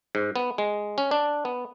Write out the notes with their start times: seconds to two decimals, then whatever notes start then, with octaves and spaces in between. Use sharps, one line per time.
0.15 G#2
0.36 B3
0.58 G#3
0.98 C#4
1.11 D4
1.45 B3